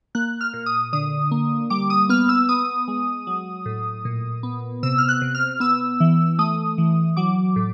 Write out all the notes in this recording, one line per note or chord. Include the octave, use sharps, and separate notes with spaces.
A#3 F#6
F6
A#2
D#6
D3 D#6
A#3
G3 D6
D#6
B3 F6
E6
B3 D#6
G#3
F#3
A2
A#2
B3
C3 E6
F6
F#6
C3
F6
B3 E6
E3
A3 D#6
E3
F#3 D6
A2